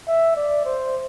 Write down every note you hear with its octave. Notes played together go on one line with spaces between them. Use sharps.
E5
D5
C5